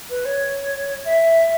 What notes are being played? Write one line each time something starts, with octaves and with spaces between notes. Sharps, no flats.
B4
C#5
E5